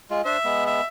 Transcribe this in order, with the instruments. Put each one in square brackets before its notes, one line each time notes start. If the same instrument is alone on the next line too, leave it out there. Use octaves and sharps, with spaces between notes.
[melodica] G#3 F4
[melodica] D4 C5 [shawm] E5
[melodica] G#3 B3
[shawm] E5